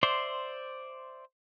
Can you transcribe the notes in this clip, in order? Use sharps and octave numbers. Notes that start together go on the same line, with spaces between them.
C5 D5 E5 C6